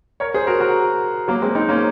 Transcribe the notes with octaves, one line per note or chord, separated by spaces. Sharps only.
A#4 C#5
G#4 C5
F#4 A#4
F#4 A#4
F#3 A#3
G#3 C4
C4 D#4
A#3 C#4